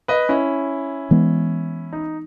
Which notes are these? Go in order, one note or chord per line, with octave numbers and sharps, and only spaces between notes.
B4 D#5
C#4 E4
E3 G#3 B3
D#4